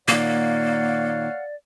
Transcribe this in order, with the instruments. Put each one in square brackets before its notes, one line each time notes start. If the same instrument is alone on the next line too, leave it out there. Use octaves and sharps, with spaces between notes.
[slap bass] A#2 D#3 [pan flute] A#3 [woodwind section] C#5 F5 F#5 [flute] D5